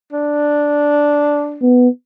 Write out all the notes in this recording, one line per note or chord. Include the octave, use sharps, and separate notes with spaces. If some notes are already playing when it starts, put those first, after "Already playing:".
D4
B3